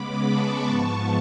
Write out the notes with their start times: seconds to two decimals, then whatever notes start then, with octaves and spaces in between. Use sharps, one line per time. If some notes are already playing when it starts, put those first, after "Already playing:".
Already playing: C#3 G#3 B3 B5 D6
0.25 A5 C#6
0.66 G#2 F3 B3 A5 C#6